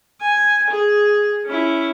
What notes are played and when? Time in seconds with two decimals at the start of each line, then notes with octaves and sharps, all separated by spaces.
0.21 G#5
0.71 G#4
1.46 C#4 E4